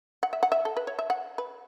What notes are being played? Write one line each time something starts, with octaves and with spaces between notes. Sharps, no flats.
F#5
E5
F#5
E5
A4
B4
C#5
E5
F#5
B4